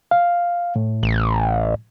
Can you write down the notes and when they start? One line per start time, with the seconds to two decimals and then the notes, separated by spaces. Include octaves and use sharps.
0.11 F5
0.76 A2
1.03 A1